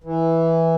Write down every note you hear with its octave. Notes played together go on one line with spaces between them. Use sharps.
E3